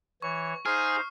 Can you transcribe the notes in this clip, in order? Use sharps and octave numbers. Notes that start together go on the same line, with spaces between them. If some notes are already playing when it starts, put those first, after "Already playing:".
E3 C#5 C#6
D#4 G#4 C5 F5 F6 C7